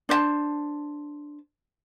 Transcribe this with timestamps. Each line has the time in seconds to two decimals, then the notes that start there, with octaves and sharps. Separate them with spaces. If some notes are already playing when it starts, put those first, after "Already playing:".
0.09 D4 C5 C#5 A5